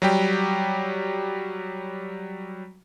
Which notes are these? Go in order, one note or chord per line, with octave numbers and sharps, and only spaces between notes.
F#3 G3 G4